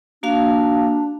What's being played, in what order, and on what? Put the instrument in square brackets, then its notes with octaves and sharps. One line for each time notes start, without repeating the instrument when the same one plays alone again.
[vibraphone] A#3 F#4 F5 [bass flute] D4